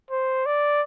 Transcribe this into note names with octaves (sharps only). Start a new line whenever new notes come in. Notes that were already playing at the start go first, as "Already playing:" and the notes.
C5
D5